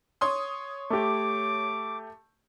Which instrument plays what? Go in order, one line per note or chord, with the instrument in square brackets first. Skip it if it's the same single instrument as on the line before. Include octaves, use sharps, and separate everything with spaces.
[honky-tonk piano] C#5 C6 D#6
[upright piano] A3 G4 [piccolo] D6